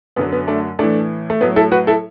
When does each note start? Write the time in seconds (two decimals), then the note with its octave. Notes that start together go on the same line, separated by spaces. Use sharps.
0.16 F#2 D3 F#3 B3
0.32 B3
0.48 A3 D4
0.79 A2 E3 A3 D4
1.30 A3
1.41 A2 F#3 B3
1.56 E4 A4
1.72 F#4 B4
1.87 E4 A4